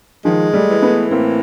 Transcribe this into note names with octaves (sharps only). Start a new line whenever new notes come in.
D#3 F3 G#3
G3 A3
E3
A3 B3
A2 A#3 C4